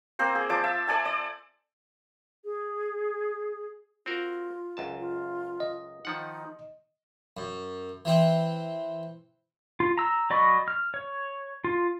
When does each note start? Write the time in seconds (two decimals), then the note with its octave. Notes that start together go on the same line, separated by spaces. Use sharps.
0.19 A#3 C4 C5
0.35 G#4
0.49 F3 D5 A5 D6
0.64 E5
0.88 A4 D5 G#5 A5
1.05 D5
2.45 G#4
4.06 C4 F4 F#4 A#4
4.77 C#2 F#2 A5
5.00 F4
5.60 D#5
6.05 D#3 F3 D#4 F#5
7.37 F#2
8.05 E3 C4
9.80 F4
9.98 A#5 E6
10.30 F#3 D5 D#5 B5 C#6
10.68 F6
10.94 C#5
11.64 F4